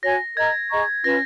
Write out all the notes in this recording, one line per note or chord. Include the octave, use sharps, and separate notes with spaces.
F#4 C#5 G#5 A#6
A#4 D#5 A#5 G#6
G#4 D#5 A#5 C#6
C#4 F4 B4 A#6